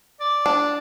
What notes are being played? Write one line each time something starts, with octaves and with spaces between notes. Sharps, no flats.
D5
D4